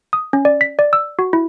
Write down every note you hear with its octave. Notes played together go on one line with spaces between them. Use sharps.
D#6
C#4
D5
B6
D5
E6
F#4
E4